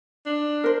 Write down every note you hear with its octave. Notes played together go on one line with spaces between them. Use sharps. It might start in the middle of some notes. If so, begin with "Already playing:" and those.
D4
A#4 C5